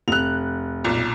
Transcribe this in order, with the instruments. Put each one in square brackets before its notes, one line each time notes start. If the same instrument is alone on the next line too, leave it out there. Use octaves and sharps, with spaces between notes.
[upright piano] F1 [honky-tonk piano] F#6 F7
[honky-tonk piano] B1 A#2